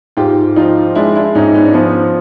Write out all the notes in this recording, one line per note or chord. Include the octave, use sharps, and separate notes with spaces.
G#2 F4 G4
F3 D#4 F4
G#3 D4 E4
D4 E4
G#2 C#4 D#4
B3 C#4
D4
F3 B3 C#4